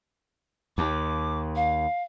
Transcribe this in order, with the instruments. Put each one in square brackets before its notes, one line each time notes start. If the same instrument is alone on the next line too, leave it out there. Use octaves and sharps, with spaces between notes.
[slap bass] D#2 [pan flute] D6
[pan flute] F5